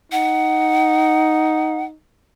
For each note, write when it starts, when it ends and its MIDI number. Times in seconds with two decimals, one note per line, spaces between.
0.12 1.95 63
0.12 1.85 78